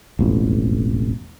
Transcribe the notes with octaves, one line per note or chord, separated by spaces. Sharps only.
E1 A1 F2